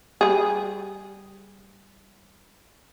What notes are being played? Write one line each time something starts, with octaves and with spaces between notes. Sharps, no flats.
G3 G#4